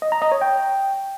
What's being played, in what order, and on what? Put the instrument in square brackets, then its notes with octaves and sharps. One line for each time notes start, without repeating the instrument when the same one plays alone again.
[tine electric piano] D#5
A#5
D#5
C#5
G5